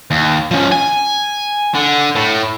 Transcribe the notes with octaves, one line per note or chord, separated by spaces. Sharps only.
D#2
F3 C#4
G#5
D3
A2